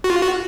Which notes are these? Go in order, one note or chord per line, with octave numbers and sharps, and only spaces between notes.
F#4
F4
F#4